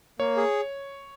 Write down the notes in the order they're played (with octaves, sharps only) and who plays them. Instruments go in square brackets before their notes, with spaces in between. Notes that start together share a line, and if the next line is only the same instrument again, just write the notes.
[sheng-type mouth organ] A#3 [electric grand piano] C#5
[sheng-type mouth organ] G#4